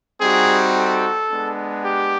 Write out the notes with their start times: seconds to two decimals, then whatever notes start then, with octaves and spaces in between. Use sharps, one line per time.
0.21 G3 C4 D#4 F#4 G#4
0.76 A4
1.31 G#3 B3 D4
1.85 G4